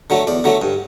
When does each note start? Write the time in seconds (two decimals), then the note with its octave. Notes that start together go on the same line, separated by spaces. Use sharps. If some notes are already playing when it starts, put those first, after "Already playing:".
0.10 D3 F#3 A3
0.27 E2 D5
0.44 D3 F#3 A3
0.62 G2